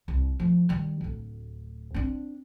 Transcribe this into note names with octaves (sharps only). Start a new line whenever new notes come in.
C2
F3 A3
D#3 G3
D1 D2
C4 D4